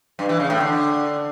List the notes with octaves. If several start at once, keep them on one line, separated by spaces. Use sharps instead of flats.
G2
E3
C#3
A2
D3